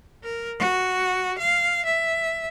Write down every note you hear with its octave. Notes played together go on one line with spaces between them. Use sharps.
A#4
F#4
F5
E5